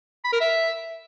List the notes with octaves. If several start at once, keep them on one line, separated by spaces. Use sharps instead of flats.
B5
A#4
E5